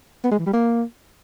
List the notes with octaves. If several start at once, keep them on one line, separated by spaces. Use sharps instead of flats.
B3
G#3
E3
G3
A#3